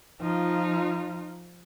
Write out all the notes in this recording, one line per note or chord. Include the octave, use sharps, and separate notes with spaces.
F3 D#4 F4